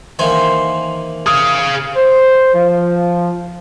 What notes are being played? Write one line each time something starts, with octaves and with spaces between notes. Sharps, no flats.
D#3 E3 A#3 C5 G#5
G#4 F5 D#6
C5
F3